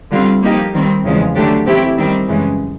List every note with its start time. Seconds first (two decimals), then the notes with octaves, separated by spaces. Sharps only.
0.11 D3 G3 C4 F4
0.42 F3 A#3 D#4 G4
0.74 D#3 G3 C4
1.04 E2 C#3 F3 G#3
1.35 D3 F#3 A3 D4 G4
1.66 E3 A3 C4 E4 G4
1.97 D#3 G3 C4
2.28 F#2 C#3 E3 G#3